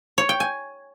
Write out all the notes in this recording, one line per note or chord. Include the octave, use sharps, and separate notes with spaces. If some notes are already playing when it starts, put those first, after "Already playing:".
C#5
G5
G#5